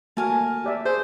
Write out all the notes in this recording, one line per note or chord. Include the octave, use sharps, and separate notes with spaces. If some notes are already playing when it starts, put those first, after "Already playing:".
A3 A#3 F#4 A#4 G#5 A5
G4 D5 E5
G#4 C5